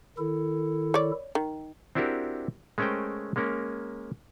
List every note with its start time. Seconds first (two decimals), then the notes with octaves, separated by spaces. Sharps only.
0.18 D#3 E4 A4
0.94 C#5 D5
1.35 D#3
1.95 C4 D4 E4 F#4 G4 A#4
2.78 G#3 A3 C#4 A#4 C5 G5
3.36 G#3 A#3 C#4 A#4